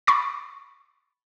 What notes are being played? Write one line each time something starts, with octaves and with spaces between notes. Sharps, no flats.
B5 C#6 A6